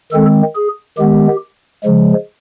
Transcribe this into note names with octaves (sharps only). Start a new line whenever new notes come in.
D#3 G#3 C4 A4
G#4
D#3 G#3 B3 G4
C#3 F3 G#3